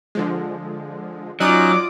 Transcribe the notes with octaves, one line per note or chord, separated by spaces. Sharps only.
D3 F3 G#3
F#3 C#4 D#4 F4 D5 D6 D#6 F#6